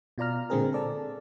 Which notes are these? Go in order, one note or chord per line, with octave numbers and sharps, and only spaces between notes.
B2 F4 D5 A#5 F6
A#2 D3 G#3 C4 G#4 A#4
A4 D5 A5